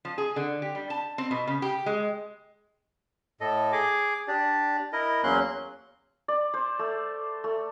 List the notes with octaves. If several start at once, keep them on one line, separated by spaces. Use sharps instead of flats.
F3
G#4
D3
G4
G3
A5
C4
B2
C#3
G4
G#3
A2 A4 D#5
G#4 G#5 D6
D4 G4 D5
E4 A#4 D#5
E2 F#3 A#3 C#4 C6 F#6
D5
C5
A3
A3